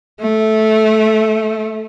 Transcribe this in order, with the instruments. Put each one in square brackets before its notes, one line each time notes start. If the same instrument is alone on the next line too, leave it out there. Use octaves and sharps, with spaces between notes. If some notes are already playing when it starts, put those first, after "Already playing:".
[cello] A3